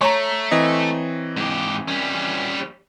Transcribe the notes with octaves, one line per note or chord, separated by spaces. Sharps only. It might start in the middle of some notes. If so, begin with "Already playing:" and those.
A3 C#5 A#5
E3 C4 D#5
G#2 G4
G3 C#4